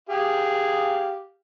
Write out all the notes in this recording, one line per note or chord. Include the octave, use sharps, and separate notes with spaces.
G4 G#4 F5